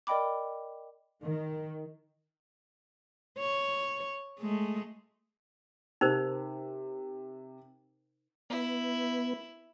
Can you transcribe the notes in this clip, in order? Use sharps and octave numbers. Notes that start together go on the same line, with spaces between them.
A#4 D5 D#5 G5 B5 D6
D#3
C#5
G#3 A3
C3 D#4 A#4 C5
B3 E4